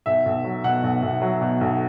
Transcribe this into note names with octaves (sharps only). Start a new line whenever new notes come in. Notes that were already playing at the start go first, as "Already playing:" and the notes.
B1 E5
B1
F#3
B2 F#5
B1
B1
F#3
B2
B1